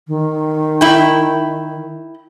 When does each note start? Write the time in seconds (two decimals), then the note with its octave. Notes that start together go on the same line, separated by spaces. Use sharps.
0.08 D#3
0.81 E4 G5